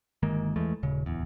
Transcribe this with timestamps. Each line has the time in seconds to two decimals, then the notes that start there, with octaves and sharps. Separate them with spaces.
0.23 G1 D#3 G#3 A#3
0.56 E2 E3 G#3 A3
0.83 D#1 C#3
1.06 D1 E2